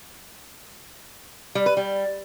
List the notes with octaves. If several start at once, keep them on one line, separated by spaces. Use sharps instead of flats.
G3
B4
G3